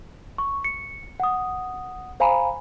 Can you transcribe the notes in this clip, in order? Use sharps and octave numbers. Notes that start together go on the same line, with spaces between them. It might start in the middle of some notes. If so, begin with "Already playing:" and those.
C#6
C#7
F#5 D#6
C5 F5 G#5 A#5 B5